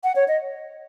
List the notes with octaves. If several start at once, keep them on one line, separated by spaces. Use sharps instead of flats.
F#5
C#5
D#5